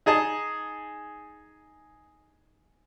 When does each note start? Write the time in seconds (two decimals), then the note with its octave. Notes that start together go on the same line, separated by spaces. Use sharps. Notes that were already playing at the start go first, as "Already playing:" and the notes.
0.06 D#4 G#4 D#5 A5